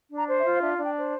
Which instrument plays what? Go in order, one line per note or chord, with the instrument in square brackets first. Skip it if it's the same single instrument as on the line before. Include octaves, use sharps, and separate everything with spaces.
[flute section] D4
A#5
C5
E5
F4
F5
D4 E5
D4 F5
G5
C5